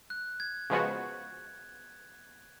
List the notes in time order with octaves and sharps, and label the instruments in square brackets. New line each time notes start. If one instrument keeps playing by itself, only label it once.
[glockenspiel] F#6
G#6
[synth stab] C#3 F3 G#3 B3 F#4